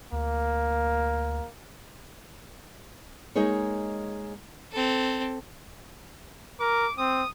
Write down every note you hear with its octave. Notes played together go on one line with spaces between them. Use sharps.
D2 A#3
G#3 A#3 D#4 G#4 C#5
C4 A4
A#4 D6
C4 D#6